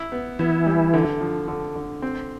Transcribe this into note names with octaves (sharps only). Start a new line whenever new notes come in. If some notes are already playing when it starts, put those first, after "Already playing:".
Already playing: E4
B3
E3 B3 E4
G3
D3
F3
D3
D3
C4